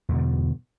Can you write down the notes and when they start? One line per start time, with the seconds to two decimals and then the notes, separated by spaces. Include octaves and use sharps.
0.09 E2
0.12 B2
0.15 D3
0.18 G2